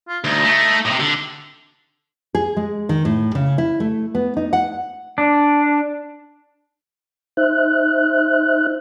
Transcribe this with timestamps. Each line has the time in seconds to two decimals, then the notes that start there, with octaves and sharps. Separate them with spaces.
0.08 F4
0.24 D2 D#4
0.44 A3
0.86 A2 C3
1.00 D3
2.35 G#4
2.57 G#3
2.89 D#3
3.05 A2
3.35 C#3
3.58 E4
3.80 A3
4.15 B3
4.37 D#4
4.53 F#5
5.18 D4
7.37 D#4 C5 E5 F#6